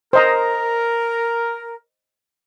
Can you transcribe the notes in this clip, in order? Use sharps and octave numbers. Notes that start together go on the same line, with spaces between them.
A#4 C5 D#5 A#5